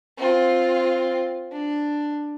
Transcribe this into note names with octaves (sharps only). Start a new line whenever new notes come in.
C4 F4
D4